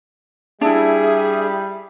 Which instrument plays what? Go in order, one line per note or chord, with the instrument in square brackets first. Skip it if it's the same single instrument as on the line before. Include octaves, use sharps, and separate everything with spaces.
[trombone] G3 [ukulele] D4 E4 [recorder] G#4 [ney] E5